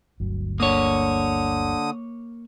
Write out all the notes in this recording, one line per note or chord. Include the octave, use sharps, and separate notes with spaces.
G1 D2 F#3
D3 A#3 C#5 D#6